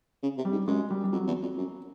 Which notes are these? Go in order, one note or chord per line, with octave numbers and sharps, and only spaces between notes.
C#3
C3
G3
G#2
F#2 G#3
G3
G3
F2 F#3
E2
F2
F#2